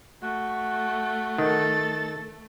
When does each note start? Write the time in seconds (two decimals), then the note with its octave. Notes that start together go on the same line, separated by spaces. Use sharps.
0.22 A3 F#4
1.38 D#3 A4 A6